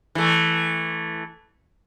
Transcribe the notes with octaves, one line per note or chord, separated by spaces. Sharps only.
E3 A3